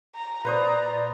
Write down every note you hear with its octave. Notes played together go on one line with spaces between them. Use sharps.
A#5
A#2 B4 C5 D5 A#5 D#6